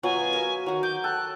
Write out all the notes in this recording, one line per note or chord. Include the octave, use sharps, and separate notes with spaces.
B2 F#3 F4 F#4 G#5
A#4 E5
D#3 F#3 F#4
D6 G6
A4 G5 F#6